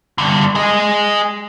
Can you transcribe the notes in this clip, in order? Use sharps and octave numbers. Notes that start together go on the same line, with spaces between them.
G2 D3
G#4 D#5